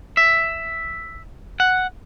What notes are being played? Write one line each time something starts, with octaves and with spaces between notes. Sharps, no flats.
E5
F#5